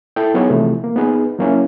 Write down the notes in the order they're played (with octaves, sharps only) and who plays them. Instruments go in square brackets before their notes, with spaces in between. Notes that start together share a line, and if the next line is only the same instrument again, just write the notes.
[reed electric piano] E4 A4 G5
F#3 B3 D#4 G#4 C#5
C3 E3 F3 A3
A#3
B3 D#4 G#4 B4
F#3 A#3 C#4 E4